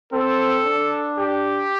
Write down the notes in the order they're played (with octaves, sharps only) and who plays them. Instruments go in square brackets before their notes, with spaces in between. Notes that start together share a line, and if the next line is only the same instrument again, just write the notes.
[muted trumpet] C4 [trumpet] A4
[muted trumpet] D4
[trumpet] G4